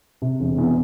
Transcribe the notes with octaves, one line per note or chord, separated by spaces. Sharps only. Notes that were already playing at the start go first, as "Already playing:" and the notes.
C3
E1
E2